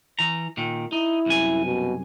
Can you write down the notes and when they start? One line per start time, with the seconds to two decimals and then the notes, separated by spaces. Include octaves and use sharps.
0.19 E3 A#5
0.57 A#2 D#3
0.93 D#4 E4
1.26 C2 F#2 G#5
1.65 B2